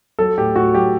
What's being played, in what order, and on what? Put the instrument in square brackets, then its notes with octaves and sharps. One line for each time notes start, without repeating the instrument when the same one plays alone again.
[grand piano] F#3 A4
A2 G4
A2 F#4
F#3 G4